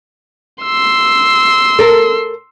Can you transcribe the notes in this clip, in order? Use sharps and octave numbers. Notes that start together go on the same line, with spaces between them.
C6 E6
A4 A#4